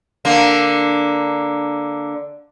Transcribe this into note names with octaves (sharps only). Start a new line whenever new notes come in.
D3 A#3